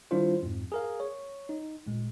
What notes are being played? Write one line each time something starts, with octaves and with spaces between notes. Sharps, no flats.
D#3 G3 D4 E4 F4 C5
F2 G#2
G#4 A#4 F5
C#5
D#4
G1 A#2 G#3